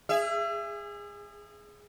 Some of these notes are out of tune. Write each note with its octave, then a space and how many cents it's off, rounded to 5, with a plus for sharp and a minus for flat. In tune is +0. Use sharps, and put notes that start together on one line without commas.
G#4 -20 E5 +35